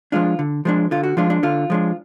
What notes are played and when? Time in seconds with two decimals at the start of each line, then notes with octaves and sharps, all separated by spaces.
0.12 F3 G#3 D4 F4
0.39 D3
0.65 F3 G#3 D4
0.91 D3 F4
1.03 F#4
1.17 F3 G#3 D4 F4
1.30 D4
1.43 D3 F4
1.70 F3 G#3 D4